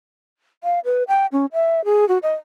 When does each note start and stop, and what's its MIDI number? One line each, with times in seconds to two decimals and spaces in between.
0.64 0.79 77
0.85 1.03 71
1.08 1.26 79
1.32 1.46 61
1.53 1.84 76
1.85 2.08 68
2.08 2.18 66
2.22 2.35 75